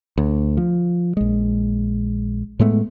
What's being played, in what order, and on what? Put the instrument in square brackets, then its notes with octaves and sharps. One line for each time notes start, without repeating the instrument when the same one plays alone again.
[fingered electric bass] D2
F3
A#1 G#3
A2 G#3 A3 B3